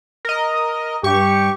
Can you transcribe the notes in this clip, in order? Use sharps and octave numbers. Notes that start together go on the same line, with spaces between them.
A#4 D#5
G2 G4 C#6